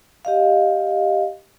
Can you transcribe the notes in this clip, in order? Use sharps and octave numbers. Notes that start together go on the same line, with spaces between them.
G4 D#5 F5